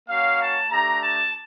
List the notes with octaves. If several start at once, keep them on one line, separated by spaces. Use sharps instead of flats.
A#3 C#4 F#4 F5
A5
A3 D4 G4 A#5
A5